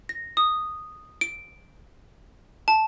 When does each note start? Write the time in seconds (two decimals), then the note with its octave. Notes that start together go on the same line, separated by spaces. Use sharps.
0.09 A#6
0.37 D#6
1.21 D7
2.68 A5